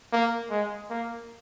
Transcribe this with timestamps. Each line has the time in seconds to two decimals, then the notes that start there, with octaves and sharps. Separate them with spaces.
0.13 A#3
0.51 G#3
0.90 A#3